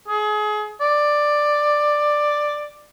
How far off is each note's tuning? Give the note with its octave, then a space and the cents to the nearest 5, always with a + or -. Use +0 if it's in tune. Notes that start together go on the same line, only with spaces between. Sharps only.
G#4 +30
D5 +10